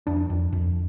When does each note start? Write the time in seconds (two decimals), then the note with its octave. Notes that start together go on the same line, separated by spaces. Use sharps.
0.07 F2 D4
0.30 F2
0.53 F2